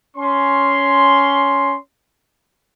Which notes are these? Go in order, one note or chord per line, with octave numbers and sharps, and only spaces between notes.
C#4 C6